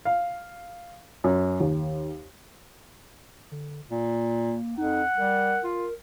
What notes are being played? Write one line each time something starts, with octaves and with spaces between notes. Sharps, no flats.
F5
F#2
D#2
D3
A#2 A#3
F2 D#4 F#5
G3 A#4
F4